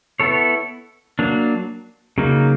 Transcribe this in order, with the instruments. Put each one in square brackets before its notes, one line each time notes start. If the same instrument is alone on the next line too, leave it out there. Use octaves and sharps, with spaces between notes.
[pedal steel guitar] B3 E4 A4 C#5
F#3 A#3 D4
C#3 F#3 A#3 D#4